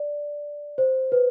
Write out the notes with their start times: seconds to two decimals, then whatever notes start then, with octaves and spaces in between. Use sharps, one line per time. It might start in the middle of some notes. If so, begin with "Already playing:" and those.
Already playing: D5
0.78 C5
1.12 B4